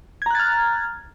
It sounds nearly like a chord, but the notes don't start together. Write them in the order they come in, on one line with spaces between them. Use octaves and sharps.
G#6 A#5 F#6 A6 F6